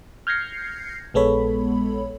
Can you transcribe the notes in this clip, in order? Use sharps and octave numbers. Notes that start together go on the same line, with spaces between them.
F6 G6 G#6 A#6 C7 C#7
A#1 G#3 B3 A4 C#5 B5